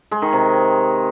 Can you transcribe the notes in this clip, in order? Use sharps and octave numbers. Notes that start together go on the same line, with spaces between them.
G#3
D#3
C3